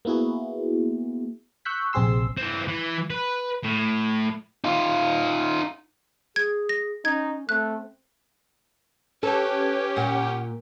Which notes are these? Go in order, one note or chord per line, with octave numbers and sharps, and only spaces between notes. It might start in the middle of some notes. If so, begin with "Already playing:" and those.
A#3 B3 E4 F#4 G#4
C#6 E6 F#6 G6 B6
A#1 C3 C4 G#4 C6 E6
E3 C4
E3
B4
A2
D#4 F4
G#4 G#6
A#6
C#4 D#4 G#6
A3 C4 F#6
C#4 G4 A4 B4 C#5
A#2 F#5